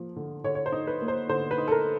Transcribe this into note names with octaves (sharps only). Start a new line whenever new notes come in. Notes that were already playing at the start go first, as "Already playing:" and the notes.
Already playing: F3 A#3
D3
D3 C#5
C#5
C5
D#4
B4
A#3
C5
D3 C5
B4
D#4
A4
A#4